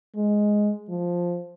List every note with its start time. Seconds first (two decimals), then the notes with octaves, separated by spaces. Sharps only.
0.16 G#3
0.89 F3